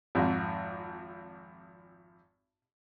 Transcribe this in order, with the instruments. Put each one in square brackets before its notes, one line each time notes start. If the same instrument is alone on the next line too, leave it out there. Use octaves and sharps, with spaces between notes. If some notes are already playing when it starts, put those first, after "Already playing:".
[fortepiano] G#1 F2 G#2